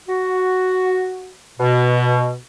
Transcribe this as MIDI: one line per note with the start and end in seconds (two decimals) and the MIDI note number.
0.08 1.32 66
1.59 2.36 47